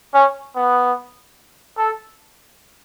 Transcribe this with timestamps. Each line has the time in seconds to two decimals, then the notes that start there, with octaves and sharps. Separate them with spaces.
0.13 C#4
0.54 B3
1.78 A4